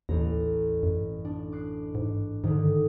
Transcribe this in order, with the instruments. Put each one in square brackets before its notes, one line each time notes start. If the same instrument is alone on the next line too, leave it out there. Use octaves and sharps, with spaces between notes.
[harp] A1 A#5 [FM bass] D#2
[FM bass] F#2
[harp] D4
D6 F#6 C7
[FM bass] G#2
[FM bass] G#2 [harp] D3 D#3